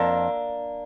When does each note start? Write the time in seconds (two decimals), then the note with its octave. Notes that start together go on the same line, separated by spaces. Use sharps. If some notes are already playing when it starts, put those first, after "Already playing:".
Already playing: F2 A#3 D4